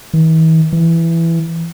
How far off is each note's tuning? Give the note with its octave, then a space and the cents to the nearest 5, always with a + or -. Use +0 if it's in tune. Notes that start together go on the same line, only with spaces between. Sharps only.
E3 -45
E3 +10